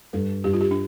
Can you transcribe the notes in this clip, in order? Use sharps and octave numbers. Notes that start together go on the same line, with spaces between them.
G2 A4
G2 G4
F4
G4
D4